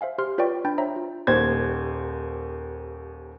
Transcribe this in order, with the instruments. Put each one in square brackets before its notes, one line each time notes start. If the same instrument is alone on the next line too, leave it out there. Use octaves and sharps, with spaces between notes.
[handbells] C5 E5 F5 G#5
G4 C5 C6 F6
F4 B4 C#5 D5 G5 C#6
D4 G5 B5 G6 A6
C5 C#5 E5 A#5
F4
[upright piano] D#1 D#2 C5 G#6